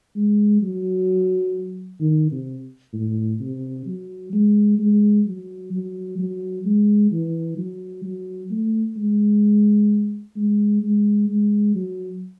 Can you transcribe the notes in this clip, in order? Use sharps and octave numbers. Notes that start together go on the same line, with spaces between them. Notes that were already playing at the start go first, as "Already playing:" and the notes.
G#3
F#3
D#3
C3
A2
C3
F#3
G#3
G#3
F#3
F#3
F#3
G#3
E3
F#3
F#3
A3
G#3
G#3
G#3
G#3
F#3